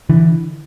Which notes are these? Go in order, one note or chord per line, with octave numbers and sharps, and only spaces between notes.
D3 E3